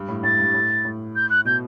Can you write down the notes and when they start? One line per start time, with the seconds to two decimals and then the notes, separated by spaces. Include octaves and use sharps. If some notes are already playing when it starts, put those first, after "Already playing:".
Already playing: G2
0.08 A2
0.23 A2 A6
0.39 G2
0.54 A2
0.85 A2
1.15 G6
1.30 F#6
1.45 B2 G6